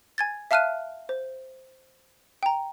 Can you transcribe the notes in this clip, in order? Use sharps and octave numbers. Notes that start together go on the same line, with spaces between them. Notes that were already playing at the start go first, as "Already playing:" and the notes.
G#5 G#6 A6
E5 F5 A5 F6 F#6 D#7
C5
G5 A#5